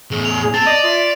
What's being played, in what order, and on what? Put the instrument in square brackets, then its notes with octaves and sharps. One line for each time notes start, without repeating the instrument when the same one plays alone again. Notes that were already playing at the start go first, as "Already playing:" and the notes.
[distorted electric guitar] E2 A2 [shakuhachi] G#4
[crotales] F7
[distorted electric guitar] C4 [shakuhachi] A5 [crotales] A6 E7
[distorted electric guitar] D5 [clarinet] D#5
[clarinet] F4 [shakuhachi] E5 [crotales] C#6